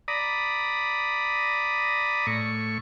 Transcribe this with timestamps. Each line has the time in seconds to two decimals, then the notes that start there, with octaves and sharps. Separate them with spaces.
0.08 D5 A#5 B5 D#6
2.27 A2 C#6